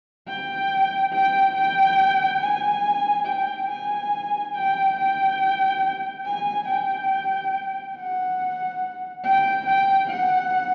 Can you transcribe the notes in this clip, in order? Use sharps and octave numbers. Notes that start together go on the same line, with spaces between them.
G5
G5
G5
G#5
G5
G#5
G5
G5
G#5
G5
F#5
G5
G5
F#5